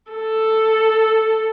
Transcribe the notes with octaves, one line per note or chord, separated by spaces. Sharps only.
A4